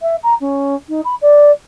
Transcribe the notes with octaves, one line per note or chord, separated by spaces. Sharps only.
E5
A#5
C#4
D#4
B5
D5